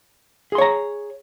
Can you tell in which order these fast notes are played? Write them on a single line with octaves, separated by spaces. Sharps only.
G#4 C6 C#5 A#5